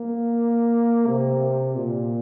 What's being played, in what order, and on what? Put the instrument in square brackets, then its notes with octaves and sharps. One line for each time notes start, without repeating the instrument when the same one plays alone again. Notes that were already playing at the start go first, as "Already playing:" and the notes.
Already playing: [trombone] A#3
C3
A#2